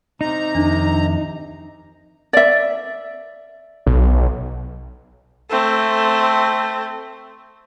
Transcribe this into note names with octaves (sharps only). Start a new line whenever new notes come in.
C3 D#4 A#5
F2 D#3 D4
D5 E5
B1
A3 C4